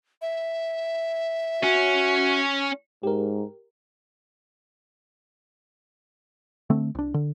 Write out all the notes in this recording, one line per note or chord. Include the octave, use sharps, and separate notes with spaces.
E5
C#4 F#4
G#2 G4 A#4
D3 A3 C4
C2 D4
D3